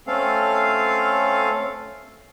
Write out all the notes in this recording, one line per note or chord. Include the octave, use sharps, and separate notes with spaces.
A3 C4 C#4 A4 F5